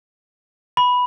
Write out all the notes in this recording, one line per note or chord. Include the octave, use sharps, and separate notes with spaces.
B5